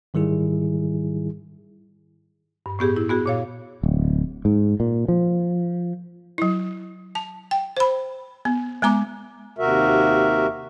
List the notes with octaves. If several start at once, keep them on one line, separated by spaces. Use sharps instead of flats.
G#2 D#3 G3 E4 G#4
G2
A2 B3 G4 G#4
E4
B3 F#4 G#4
A#2 C#5 F5
D1
G#2
A#2
F3
F#3 E4
A5
G5
C5 B5
B3
G#3 B3 A#5 D6
D#2 C3 F#4 A#4 E5